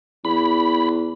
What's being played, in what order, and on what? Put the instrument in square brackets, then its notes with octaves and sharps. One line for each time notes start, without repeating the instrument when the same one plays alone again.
[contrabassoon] E2 [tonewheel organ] B5